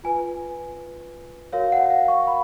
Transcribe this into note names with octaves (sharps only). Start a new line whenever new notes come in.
F4 B4 G#5
F#4 A#4 C#5 F5
F#5
F5
C#6
B5